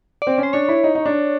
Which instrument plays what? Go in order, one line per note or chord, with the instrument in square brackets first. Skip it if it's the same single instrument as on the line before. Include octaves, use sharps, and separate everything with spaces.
[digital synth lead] D5
[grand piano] C4
C#4
[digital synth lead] C5
[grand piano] D4 [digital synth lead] C#5
[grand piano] E4
D#4
D#4
D4